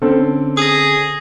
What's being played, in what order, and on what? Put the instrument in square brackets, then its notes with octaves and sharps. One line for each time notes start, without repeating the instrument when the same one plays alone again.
[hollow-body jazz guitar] D3 C#4 [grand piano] C4 A4
[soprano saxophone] G#4 [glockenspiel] D#6 A#6